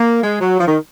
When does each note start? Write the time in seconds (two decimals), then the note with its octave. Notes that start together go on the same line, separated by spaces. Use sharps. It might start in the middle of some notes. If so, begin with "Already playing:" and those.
Already playing: A#3
0.23 G#3
0.41 F#3
0.60 F3
0.68 D#3